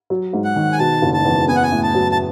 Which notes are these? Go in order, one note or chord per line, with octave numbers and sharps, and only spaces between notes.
F#3
G#2
F#5
D#3
G#5
B2 A5
F#1
A5
E2
B3 G#5
F#5
G#5
A2
A5
F#3
A5